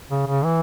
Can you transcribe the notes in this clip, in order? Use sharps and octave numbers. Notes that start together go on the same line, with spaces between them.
C#3
C#3
E3